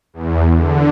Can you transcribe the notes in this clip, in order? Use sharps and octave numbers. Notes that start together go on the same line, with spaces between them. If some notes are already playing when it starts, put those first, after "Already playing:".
E2
D3